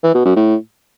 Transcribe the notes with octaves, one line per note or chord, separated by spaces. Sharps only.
E3
B2
F#2
A2